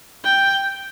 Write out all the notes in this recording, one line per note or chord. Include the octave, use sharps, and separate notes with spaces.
G5